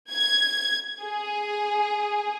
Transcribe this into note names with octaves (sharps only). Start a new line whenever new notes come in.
G#6
G#4